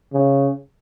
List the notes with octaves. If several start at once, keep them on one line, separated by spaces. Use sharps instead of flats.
C#3